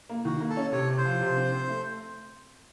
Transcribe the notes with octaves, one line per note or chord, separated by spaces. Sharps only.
A#3
D#3 F#4
A#3
A4
C#4
C3 C#5
C3
C5
F3
C3
C4
C4
A3